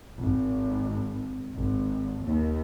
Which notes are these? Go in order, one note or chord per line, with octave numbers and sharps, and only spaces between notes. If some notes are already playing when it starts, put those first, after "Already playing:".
G#1
G#1
D#2